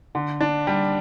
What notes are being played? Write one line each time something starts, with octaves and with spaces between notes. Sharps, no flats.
D3
D4
G3